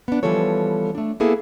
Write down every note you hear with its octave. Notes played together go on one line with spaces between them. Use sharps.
B3 D4
E3 F3 G3 B3 A4 C#5
A3 D4
A#3 B3 E4 G#4 A4